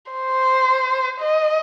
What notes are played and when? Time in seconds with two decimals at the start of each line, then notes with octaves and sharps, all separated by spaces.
0.12 C5
1.20 D#5